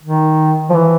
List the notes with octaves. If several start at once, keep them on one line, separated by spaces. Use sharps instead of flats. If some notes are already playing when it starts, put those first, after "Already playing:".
D#3
F3
E3